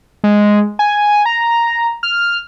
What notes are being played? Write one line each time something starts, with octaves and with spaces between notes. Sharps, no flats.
G#3
G#5
A#5
F6